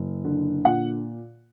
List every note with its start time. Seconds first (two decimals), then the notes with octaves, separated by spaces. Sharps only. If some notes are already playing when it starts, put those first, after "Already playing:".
Already playing: F#1
0.25 D3
0.65 A#2 F#5